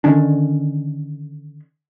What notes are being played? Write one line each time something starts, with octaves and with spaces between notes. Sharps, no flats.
D3 D#3 C#4 D4